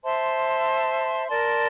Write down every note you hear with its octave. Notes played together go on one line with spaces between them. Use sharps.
C5 E5 A5 C6
A#4 D5 A5 C6